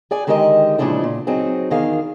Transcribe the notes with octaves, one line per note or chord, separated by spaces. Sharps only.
G#4 D5 G#5
D3 D#3 G#3 G4 A#4 D#5
A#2 C#3 F3 G#3 D4 E4
A#2
F#3 C4 D#4 G#4
E2 D#3 G#4 F5